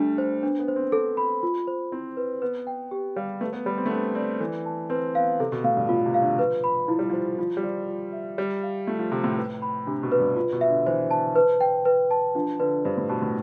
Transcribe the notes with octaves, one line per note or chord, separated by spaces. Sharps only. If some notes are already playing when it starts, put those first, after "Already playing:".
Already playing: G3 A3 D4
C5
B3 D4
B3
C5
C4
B3 A4
B5
F4
C5
C4 E4
B4
B3 B4
G5
G4
G3 F5
A3 B4
B3
G3 B5
C4
A3
B3 D4
C4 D5
E3 A4
A5
C4 B4
B3 F5
C3 A4
B2
A2 F5
G2
A2 F4
C3
F5
D3
F3 B4
B5
F3 E4
G3
F3
C5
F3 F4
G3
F3 D5
F4
E5
G3 G4
F5
A3 F4
F3
C3 G5
A2
B4
B5
C3 D4
B2
B4
G2
F4
B2
E5
D3
E3 C5
A5
B4
G5
B4
A5
F3 D4
D3 B4
G2 C5
A2
B2 A5
A2